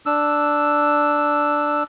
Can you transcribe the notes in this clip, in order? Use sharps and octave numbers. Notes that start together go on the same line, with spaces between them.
D4 E6